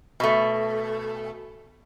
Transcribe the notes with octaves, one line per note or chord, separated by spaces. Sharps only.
B2 A3